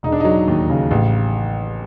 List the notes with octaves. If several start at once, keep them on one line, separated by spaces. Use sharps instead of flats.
E1 D#4
D4
F#3 D#4
D#2
C#3
A1